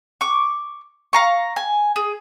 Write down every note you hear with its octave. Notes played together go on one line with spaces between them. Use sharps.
C#6 D6
F5 A#5 C#6
G#5
G#4